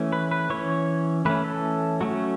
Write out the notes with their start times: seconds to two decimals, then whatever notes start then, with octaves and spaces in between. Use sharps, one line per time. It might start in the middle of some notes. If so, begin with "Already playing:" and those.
Already playing: E3 A3 C#4
0.12 B4
0.31 B4
0.50 E3 C#4 C#5
1.25 E3 A3 C#4 B4
1.45 A4
2.01 F#3 A3 C#4 F#4